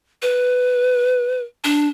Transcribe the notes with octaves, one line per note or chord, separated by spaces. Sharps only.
B4
D4